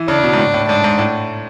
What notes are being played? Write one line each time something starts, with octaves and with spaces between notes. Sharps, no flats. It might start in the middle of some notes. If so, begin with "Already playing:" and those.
Already playing: E3
C#3 D4
C#3
B2
G#2
A2
A2
G#2 D4
G#2
A2